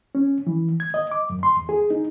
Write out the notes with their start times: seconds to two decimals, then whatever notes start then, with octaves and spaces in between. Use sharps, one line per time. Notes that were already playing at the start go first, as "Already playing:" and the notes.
0.15 C#4
0.47 E3
0.80 G#6
0.94 D#5
1.11 D6
1.30 F#2
1.43 C6
1.57 E2
1.69 G#4
1.90 D#4